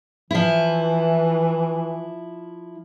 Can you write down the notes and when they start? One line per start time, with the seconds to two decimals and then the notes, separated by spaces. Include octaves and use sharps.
0.31 E3 F3 E4